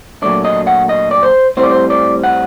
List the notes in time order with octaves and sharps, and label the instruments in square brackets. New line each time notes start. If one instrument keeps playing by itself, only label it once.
[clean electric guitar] A#2 F#3 A3 D4 D5
D#5
F#5
D#5
D5
C5
A2 G3 C4 C5
D5
C5
D5
F#5